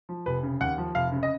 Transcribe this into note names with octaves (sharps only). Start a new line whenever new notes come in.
F3
F1 B4
C#3
D#2 F#5
F3
F1 F5
C#3
D#5